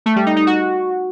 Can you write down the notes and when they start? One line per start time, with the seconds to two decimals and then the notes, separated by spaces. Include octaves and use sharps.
0.06 A3
0.16 G3
0.26 D#4
0.36 D#4
0.47 F#4